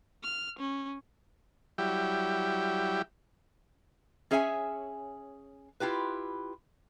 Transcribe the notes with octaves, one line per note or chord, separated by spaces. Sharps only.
F6
C#4
F#3 G3 E4 G4
C#4 G#4 C#5 E5 G5 G#5
E4 F4 G4 B4